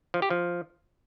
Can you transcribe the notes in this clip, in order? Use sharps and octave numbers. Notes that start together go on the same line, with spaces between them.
F3
G4
F3